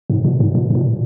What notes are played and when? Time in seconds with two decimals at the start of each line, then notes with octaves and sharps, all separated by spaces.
0.10 G#2
0.25 A#2
0.40 G#2
0.55 A#2
0.70 G#2
0.75 A#2